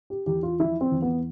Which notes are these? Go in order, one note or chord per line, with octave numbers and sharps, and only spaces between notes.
G4
E2 G4
F4
F3 E4
C4
E2
B3